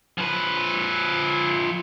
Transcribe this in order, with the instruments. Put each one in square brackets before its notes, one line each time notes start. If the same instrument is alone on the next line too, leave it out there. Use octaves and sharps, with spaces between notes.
[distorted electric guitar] F3 B4